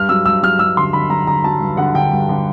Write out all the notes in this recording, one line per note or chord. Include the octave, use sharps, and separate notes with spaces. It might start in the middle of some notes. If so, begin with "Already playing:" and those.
Already playing: G2 F6
F#3 E6
G2 E6
F#3 F6
G2 E6
D3 C6
D3 B5
F#3 A#5
D3 A#5
F#3 A5
G2
D3 F#5
D3 G5
G2
D3